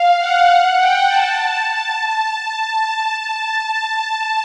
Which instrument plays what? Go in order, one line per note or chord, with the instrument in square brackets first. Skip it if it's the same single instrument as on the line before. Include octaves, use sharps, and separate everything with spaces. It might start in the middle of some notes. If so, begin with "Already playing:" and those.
Already playing: [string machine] F5
F#5
G5
A5
A5